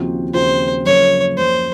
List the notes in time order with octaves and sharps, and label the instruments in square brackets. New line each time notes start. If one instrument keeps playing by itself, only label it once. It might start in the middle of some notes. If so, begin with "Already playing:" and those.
Already playing: [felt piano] D#2 C#3 F3 C4 F#4
[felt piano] D#2 C#3 F3 C4 F#4 [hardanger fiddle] C5
[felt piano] F#1 F#2 C#3 F3 A#3 [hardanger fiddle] C#5
[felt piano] F#1 F#2 C#3 F3 A#3 [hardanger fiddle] C5